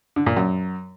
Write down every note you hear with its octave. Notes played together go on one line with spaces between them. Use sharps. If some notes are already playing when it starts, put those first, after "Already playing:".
D3
A#2
F#2